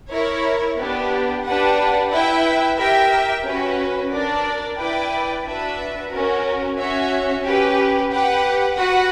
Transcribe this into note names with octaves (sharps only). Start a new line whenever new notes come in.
E4 A#4 C#5
B3 D4 G4
D4 G4 B4 F#5
E4 B4 E5 G5
G4 A#4 E5 G5
C#4 F#4 B4
D4 A#4 D5
E4 B4 D5 G5
D4 F#4 B4 E5
C#4 F#4 A#4
C#4 F#4 C#5 E5
C#4 G4 B4
G4 B4 F#5
F#4 B4 F#5